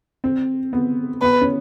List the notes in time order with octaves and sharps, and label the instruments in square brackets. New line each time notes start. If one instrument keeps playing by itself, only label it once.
[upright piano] C4
B3
[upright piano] B3 [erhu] B4
[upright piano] C#4